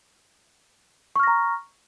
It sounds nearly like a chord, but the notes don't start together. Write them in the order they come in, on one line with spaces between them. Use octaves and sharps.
C#6 F6 A#6 A#5